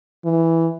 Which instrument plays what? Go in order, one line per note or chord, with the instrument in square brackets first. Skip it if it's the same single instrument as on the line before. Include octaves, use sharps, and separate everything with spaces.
[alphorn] E3